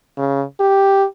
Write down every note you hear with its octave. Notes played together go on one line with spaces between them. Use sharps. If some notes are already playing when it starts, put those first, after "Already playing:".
C#3
G4